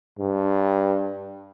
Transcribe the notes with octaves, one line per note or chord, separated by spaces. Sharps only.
G2